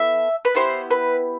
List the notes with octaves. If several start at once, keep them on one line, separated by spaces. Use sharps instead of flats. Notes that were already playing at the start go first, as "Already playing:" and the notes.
Already playing: B3 E4 A4 E5
B4
B3 E4 G4 C5
B4